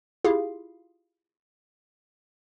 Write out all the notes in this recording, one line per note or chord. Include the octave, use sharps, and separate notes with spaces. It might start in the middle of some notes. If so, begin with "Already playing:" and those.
E4 F4 G4 G#4 F5